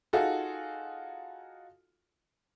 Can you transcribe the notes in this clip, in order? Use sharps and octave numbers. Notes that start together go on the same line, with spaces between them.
D#4 F4 F#4 G#4 A4